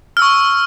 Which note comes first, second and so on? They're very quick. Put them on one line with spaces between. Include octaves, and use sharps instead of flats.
F6 E6 C#6